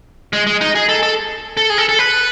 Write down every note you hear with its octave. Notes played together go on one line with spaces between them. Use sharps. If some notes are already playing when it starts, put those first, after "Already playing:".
G#3
G#3
D#4
G#4
A4
A4
A4
G#4
A4
A4
B4